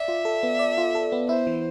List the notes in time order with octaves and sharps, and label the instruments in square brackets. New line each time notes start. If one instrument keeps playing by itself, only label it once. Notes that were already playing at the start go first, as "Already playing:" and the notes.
Already playing: [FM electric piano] D5 [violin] E5
[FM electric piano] F4
A4
B3
D5
F4
A4
B3
[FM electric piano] E4 [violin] C5
[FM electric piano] E3